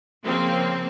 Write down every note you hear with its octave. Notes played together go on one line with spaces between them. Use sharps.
C#3 F3 A#3 C4